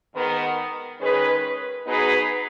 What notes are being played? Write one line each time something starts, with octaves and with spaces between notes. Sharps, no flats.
G#2 D#3 B3
D#3 G#3 C#4 G#4 B4
F#3 B3 D#4 G#4 B4